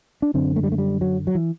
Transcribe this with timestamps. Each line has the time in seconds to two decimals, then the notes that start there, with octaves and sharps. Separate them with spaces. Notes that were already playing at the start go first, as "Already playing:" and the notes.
0.22 D4
0.34 F#2 D3 C4
0.56 A3
0.63 G3
0.72 A3
0.78 G3
1.01 F#3
1.27 F#3
1.35 E3